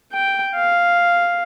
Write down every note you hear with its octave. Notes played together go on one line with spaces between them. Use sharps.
G5
F5